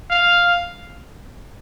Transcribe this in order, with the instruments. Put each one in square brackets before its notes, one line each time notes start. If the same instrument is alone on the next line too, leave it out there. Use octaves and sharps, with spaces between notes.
[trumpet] F5